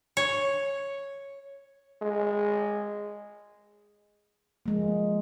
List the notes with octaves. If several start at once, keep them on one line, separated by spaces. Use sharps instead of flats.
C#5
G#3
F3 G#3 A#3